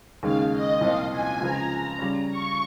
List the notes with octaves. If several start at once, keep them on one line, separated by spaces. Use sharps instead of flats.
D#2 C#3 G#3 F5
D#5
C2 A#2 F3 C4 F5
G#5
C#2 C#3 F3 A#5
C#3 G3 C#4
C#6